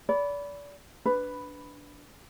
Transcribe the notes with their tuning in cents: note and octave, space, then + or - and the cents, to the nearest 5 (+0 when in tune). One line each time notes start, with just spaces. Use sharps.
D5 -30 B5 +0
D4 -10 B4 +10 B5 +0